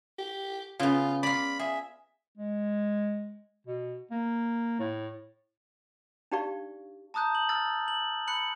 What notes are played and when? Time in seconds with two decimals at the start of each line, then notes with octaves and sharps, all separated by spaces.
0.18 G4
0.79 C#3 B3 F4
1.23 F4 D5 B5
1.59 G#4 E5
2.37 G#3
3.67 B2
4.11 A#3
4.80 A2
6.32 D4 D#4 G4 D5 F5 C#6
7.14 A5 A#5 D#6 F#6 G6
7.35 F#7
7.49 E6 F6 A6
7.88 F#7
8.28 B5 F#6 C#7 F#7